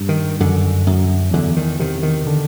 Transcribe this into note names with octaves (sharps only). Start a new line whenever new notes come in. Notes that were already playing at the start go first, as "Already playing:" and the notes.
Already playing: G2
D#3
F#2 D3
F#2
E2 D3
D#3
C3 D#3
D#3
D3